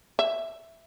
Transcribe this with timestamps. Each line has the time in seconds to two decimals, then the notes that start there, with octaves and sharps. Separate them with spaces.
0.19 E5